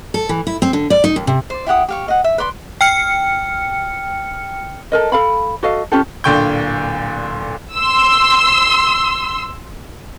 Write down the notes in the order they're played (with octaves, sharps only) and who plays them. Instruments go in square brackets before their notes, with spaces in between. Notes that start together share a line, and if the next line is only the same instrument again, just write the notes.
[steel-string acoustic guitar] A4
E3
E4
C4
D3
D5
D#4
D#2
C3
[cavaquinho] C5 D5
E4 G4 F#5 D#6
G4 F5 C#6
D#5 F#5
E5
B4 D5 C6 C#6
[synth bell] G5 F6 C#7
[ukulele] A4 A#4 D#5
A4 F5 B5
F#4 A4 D#5 F5
C#4 F4 G4 A4
[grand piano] D1 A#2 D3 G5 C#6 G6
[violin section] C6 E6